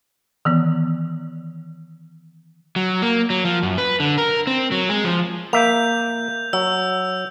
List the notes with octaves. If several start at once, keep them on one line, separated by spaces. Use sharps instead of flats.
D#3 E3 B3
F#3
A#3
F#3
F3
F#2
B4
D3
A#4
C4
F#3
G#3
F3
A#3 E5 G6 F7
F#3 E6